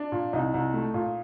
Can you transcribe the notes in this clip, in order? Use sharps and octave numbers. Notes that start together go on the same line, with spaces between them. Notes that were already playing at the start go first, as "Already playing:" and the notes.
Already playing: D4
A#2
C2 D#4
C2
A3
A#2